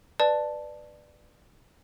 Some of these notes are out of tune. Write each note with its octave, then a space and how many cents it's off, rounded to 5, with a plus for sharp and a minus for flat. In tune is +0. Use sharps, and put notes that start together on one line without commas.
B4 +0 D5 +15 A5 +0